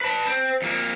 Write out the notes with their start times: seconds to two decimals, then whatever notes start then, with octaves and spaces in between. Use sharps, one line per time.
0.01 B4 A5
0.26 C4
0.62 F2 A#3